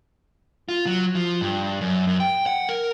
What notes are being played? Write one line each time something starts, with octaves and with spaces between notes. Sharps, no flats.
F4
F#3
F3
G2
F#2
F#2
G5
F#5
A#4